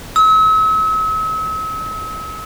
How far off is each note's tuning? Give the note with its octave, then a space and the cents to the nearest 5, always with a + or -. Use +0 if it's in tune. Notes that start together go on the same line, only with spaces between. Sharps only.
E6 -40